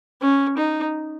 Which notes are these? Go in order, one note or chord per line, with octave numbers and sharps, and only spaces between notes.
C#4
D#4